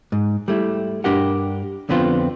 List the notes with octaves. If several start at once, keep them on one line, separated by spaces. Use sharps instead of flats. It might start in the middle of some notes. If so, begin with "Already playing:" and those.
G#2
G3 A3 E4
G2 D4 G4 A#4 F#5
F2 D3 B3 C4 F4